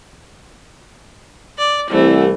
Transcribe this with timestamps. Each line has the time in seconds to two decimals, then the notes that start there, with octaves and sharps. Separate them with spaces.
1.58 D5
1.91 C2 E3 A3